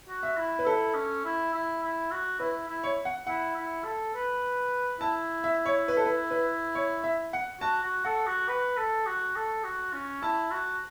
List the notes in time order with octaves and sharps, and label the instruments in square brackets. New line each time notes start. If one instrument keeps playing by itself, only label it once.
[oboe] F#4
[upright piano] E5
[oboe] E4
[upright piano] B4
[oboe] E4 [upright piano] A4
[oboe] C#4
E4
E4
E4
F#4
[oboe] E4 [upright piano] B4
[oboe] E4
[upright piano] C#5
F#5
[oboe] E4 [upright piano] F#5
[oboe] E4
A4
B4
[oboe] E4 [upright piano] A5
[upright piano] E5
C#5
B4
A4
B4
B4
C#5
E5
F#5
[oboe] F#4 [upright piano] A5
[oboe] F#4
[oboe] A4 [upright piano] F#5
[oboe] F#4
B4
A4
F#4
A4
F#4
C#4
[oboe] E4 [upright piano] A5
[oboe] F#4